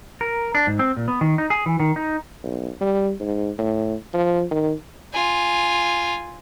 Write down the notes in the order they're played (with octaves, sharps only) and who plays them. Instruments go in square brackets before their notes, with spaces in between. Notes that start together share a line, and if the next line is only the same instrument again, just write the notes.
[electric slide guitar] A#4
D4
G#2
C4
A#2
B3
D#3
D#4
G#4
E3
D#3
D#4
[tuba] B1
G3
G#2
A2
F3
D#3
[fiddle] F4 G#5